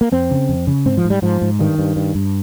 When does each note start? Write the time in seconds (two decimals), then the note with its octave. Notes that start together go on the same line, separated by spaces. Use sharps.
0.01 A#3
0.12 F2 C4
0.31 C#3
0.49 F2
0.67 C#3
0.85 G#2 C4
0.97 F3
1.04 G#2
1.10 G3
1.22 G#2 F3
1.41 G#2
1.59 G2 D#3
1.79 G2
1.96 G2
2.15 G2